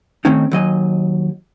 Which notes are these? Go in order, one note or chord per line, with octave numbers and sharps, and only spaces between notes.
D#3 A3 C4 C#4 D#4
D#2 F#3 D#5 G#5